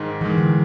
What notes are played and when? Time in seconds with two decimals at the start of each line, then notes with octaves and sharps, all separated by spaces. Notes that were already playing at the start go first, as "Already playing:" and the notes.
Already playing: G#2 D#3 G#3
0.21 G#2 D#3 E3 G#3
0.38 D3